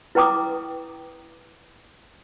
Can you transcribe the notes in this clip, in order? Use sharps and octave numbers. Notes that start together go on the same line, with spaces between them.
E4 B4 G5 A#5 D6 D#6